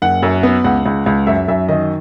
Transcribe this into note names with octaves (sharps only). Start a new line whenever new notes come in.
F#1 F#5
F#2
B3
C#2 F#5
C#2
C#2
F#2 E5
F#2 E5
D#3 D#5